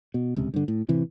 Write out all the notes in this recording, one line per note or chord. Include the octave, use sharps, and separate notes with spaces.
B2
D#1 C#2 C3
G2 D3
A2
A1 C3 E3